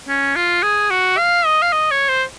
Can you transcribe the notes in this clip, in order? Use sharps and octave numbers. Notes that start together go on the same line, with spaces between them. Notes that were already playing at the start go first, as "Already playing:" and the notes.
C#4
F4
G#4
F#4
F5
D#5
F5
D#5
C#5
C5